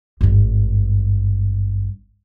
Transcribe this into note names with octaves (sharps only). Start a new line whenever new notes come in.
G#1 G2